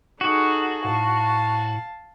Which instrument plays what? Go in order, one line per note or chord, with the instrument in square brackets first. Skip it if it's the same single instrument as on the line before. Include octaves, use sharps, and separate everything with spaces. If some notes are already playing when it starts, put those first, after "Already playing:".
[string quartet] D#4 G#4 A4 [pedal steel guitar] F#4
[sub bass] A2 [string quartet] F5 A5